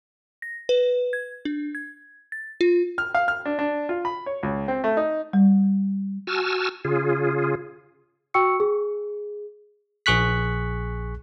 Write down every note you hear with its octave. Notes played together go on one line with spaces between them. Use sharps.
A#6
B4
G#6
D4
G#6
A6
F4
F6
F5
F6
D4
D4
F4
B5
C#5
C#2
C4
A3
D#4
G3
F#4 G#5 A5 E6 F6
C#3 F4 G#4
F#4 G5 C#6 E6 C#7
G#4
A#1 G#4 C#6 F#6 B6